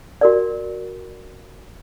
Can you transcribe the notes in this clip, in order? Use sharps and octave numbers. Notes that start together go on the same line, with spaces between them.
F#4 A#4 D5